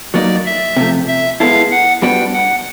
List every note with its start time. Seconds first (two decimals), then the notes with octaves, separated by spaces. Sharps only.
0.14 F#3 A#3 D#4 D5
0.45 E5
0.77 C3 F3 A3
1.08 E5
1.40 G#3 B3 E4 A4 F5
1.72 F#5
2.02 G3 B3 D4 F#4 G5
2.34 F#5